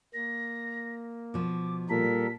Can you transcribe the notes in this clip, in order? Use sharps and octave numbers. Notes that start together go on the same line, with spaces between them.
A#3 A#6
B2 F3 D6
A#2 G3 A4 A#4 B6